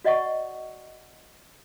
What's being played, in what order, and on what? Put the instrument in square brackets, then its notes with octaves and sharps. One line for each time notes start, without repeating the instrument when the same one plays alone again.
[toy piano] F#4 D5 D#5 F#5 C#6